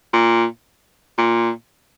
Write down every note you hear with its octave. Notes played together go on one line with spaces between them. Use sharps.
A#2
A#2